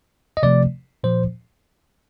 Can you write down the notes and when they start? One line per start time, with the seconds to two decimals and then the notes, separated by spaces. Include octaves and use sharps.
0.37 D#5
0.43 C3 F3 A3 D5
1.03 A#2 F3 C5